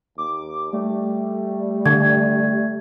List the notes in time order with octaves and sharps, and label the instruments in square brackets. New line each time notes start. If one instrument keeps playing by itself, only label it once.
[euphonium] D#2 [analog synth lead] D6
[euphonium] G3 [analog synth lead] A3
[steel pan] D3 [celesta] G#6